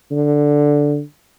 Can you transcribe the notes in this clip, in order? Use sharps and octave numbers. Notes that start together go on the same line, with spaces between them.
D3